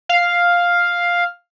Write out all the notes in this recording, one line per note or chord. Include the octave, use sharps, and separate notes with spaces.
F5